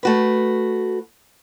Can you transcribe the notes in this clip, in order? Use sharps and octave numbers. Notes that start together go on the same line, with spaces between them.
A3 F#4 B4